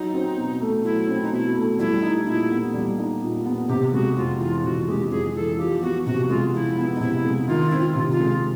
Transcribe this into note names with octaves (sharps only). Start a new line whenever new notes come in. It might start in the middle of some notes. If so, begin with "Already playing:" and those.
Already playing: F#3 D#4
C4
B2
A3
F#3 E4
C4
D#4
B2 E4
A3
G3 E4
D#4
A#2 E4
B3
G3
D#4
A#2
B3
C3 G4
G#3 F#4
F2 F4
E3 F4
C3 F#4
G#3 G4
F2 G#4
E3 A4
F3 G4
B3 F#4
C3 F#4
G#3 F4
F3 E4
B3
D#4
C3 E4
G#3
E4
D#3 F4
C4 E4
F4
C3
F4
G#3